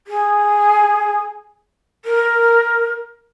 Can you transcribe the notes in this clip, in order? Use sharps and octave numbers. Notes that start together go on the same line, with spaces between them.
G#4
A#4